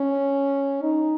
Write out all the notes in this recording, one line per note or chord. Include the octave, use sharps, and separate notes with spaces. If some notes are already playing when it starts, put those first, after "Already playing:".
Already playing: C#4
D#4